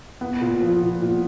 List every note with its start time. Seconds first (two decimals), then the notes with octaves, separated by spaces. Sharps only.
0.21 B3
0.41 A#2
0.61 F3
0.82 A#2
1.02 A#2